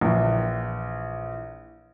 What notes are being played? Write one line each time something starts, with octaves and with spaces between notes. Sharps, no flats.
A#1 E3